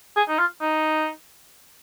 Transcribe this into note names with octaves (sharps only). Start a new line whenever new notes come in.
G#4
D#4
F4
D#4